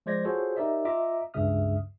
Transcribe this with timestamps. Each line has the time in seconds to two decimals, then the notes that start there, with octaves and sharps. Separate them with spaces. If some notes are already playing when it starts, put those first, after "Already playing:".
0.06 F3 G#3 C5 D5 G#6 A#6
0.25 F4 F#4 G#4 A4 C5 C#5
0.57 D#4 G4 A#4 D5 E5
0.85 F4 D#5 E5 A#5 D6
1.34 C#2 G2 C#3 E5 D#6 F6